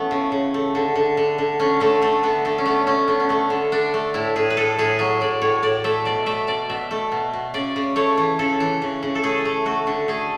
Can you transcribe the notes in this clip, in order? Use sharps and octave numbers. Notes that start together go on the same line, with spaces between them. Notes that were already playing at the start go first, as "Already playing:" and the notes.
Already playing: E3 A3 B3 C#4
C#3
C#3
A3
D3
D3
D3
D3
D3 C#4
D3 A3
D3 A3
D3 B3
D3 A3
C#4
A3 B3
A3 C#4
D3 B3
C#4
A3 B3
D3
D3 D4
A3
A2 E4
A2 G#4
B4
A2 A4
A2 G#4
F#3 G#4
A2 D5
A2 C#5
A2 D5
A3 E5
B2 D5
A3 E5
B2 D5
B2 E5
A3
B2
B2
C#3 D5
C#3
A3 C#5
E3
C#3 A4
E3
C#3
C#3
A4
A3 G#4
A3
A3 F#4
D3
A3 G#4